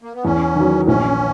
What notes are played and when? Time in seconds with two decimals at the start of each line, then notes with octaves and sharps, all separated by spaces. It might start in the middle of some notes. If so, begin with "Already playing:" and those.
0.02 A#3
0.13 B3
0.24 E2 C#4
0.56 D#3 F#3
0.87 A#1 C#4